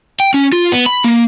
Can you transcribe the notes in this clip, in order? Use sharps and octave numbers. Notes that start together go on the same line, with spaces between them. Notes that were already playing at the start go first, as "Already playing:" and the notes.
G5
C#4
F4
B3
B5
A#3